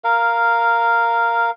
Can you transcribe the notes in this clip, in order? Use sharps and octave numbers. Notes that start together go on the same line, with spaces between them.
A#4 F5